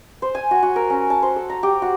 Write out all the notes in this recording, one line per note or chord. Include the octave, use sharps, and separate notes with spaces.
C5
G#5
F#4
F#4
A#4
C#4
A5
C5
A4
A#5
G4
F#4